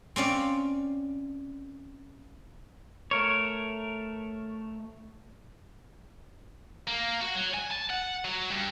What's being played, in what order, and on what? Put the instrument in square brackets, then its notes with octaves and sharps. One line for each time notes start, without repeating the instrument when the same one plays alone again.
[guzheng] C4 C#4 D5 F5
[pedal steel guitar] A3 A#4 C#5
[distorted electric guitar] A#3
F#4
F#3
G#5
A5
F#5
F#3
G2